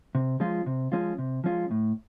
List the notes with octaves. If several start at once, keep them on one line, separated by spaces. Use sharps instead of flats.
C3
F3 G#3 C#4 F4
C3
F3 G#3 C#4 F4
C3
F3 G#3 C#4 F4
A2